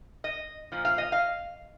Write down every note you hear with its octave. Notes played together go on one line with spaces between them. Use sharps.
D#5
A#2 F3
F5
D#5
F5